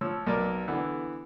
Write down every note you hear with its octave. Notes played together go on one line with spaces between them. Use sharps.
F3 C#5 E6
B1 A#4 D5
D3 E3 B3